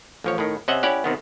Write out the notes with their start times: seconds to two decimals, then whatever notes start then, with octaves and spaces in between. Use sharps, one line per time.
0.24 A1 F3 C#5
0.38 A2 D#3
0.68 C3 C#4 D#5 E5 F#5
0.83 C#4 E4 G4 D5 F#5
1.04 C3 D#3 B3